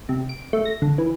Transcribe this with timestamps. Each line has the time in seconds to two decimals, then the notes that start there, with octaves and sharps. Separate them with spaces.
0.09 C3
0.29 D7
0.53 A3
0.65 A#6
0.82 D3
0.98 E3